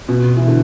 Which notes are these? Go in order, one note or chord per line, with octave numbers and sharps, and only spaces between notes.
B2
E3
D3